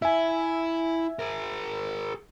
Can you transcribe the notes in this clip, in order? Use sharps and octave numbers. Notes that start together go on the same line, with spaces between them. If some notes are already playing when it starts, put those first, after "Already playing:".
E4 E5 G#5
G#4 A#4